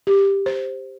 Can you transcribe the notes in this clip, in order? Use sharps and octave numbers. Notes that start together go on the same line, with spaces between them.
G4
C5